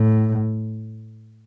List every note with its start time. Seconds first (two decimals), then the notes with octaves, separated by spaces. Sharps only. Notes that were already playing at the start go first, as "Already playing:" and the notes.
Already playing: A2